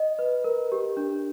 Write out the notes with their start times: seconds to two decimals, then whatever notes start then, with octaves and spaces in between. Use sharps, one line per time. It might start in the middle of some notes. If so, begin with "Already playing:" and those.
Already playing: D#5
0.19 B4
0.44 A#4
0.72 G4
0.97 D4